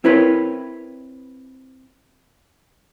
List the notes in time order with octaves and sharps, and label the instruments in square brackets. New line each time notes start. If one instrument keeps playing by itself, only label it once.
[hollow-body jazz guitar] C4 E4 A#4 B4 C#5